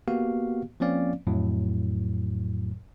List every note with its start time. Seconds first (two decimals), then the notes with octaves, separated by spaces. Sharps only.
0.08 A#3 B3 F#4 G4 F5
0.80 F3 A#3 C4 C#4 D5 F5
1.27 F2 A2 F#3